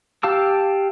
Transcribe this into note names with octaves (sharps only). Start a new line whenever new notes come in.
G4 F5 A5 D6 E6